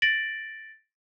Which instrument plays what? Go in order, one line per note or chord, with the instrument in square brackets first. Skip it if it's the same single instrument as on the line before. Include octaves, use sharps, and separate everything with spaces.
[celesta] A6 A#6 D7 F#7